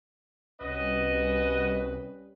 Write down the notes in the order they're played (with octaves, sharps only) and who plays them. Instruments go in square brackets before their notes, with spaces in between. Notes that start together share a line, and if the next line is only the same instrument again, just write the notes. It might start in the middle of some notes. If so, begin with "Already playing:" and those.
[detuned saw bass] C2 [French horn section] G3 C#4 [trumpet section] F#4 D#5 [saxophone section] B4